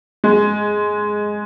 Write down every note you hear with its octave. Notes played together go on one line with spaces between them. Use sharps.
G#3